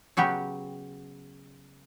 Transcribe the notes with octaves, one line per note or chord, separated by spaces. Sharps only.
C#3 F#3 B3 G4